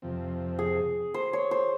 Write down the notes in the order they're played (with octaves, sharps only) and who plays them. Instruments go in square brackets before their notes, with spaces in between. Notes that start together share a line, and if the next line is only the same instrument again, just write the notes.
[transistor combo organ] F2 C3 F3 C4
[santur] G#4
C5
C#5
C5